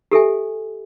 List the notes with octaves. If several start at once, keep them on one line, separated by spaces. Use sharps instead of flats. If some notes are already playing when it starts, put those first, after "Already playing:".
G4 A4 E5 G#5